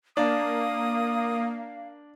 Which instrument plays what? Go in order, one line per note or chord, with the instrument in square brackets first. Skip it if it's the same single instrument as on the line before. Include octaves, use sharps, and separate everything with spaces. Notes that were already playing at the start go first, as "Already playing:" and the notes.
[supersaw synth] A#3 [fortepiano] D4 [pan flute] F5 [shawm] D#6